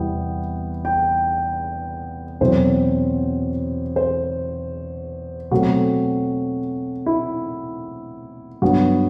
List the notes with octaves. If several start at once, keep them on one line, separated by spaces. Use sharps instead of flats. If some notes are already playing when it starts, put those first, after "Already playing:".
Already playing: E2 C3 G3 B3 G5
G5
E2 B2 F#3 C4 C5
C5
B2 F#3 A3 C4 F#4
E4
G2 F#3 B3 F#4